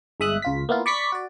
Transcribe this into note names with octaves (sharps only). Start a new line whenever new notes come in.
G1 G#3 E5 D#6 F#6
C#2 F4 B6
A#3 B3 E4 F4
D5 B5 C#6 D6 B6 C#7
F#4 D5